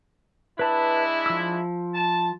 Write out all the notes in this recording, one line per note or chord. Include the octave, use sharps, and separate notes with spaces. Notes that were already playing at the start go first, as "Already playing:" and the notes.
G#3 D4 E4 B4 A5 B5
F3 E6
A5